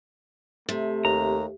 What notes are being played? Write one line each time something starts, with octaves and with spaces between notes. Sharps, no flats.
C3 A3
D#2 A#5